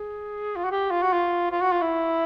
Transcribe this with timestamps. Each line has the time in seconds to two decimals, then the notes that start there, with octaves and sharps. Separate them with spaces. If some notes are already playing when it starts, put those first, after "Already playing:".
Already playing: G#4
0.56 F4
0.64 F#4
0.71 G4
0.91 F4
1.02 F#4
1.13 F4
1.51 F4
1.61 F#4
1.71 F4
1.82 E4